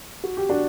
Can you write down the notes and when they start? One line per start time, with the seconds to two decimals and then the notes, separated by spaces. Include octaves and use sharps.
0.24 F#4
0.37 G4
0.49 D4 F#4